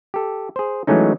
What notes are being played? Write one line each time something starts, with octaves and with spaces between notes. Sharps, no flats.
G4 A4
G#4 C5
E3 F#3 G#3 A3 C#4 D#4